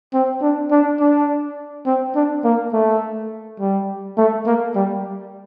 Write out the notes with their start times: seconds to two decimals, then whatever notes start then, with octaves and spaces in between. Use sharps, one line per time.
0.14 C4
0.42 D4
0.71 D4
1.00 D4
1.86 C4
2.16 D4
2.45 A#3
2.73 A3
3.60 G3
4.18 A3
4.46 A#3
4.75 G3